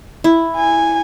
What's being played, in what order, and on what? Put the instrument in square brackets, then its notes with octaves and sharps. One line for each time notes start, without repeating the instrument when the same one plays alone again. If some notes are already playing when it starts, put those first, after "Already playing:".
[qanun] E4
[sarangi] G#5